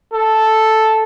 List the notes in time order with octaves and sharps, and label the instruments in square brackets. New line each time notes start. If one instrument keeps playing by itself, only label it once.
[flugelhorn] A4